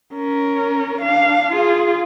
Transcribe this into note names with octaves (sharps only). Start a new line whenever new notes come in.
C#4 A#4
D4 F5
F4 G#4